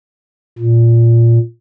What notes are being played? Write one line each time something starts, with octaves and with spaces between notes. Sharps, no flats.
A#2